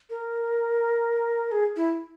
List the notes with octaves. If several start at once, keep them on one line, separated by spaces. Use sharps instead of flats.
A#4
G#4
E4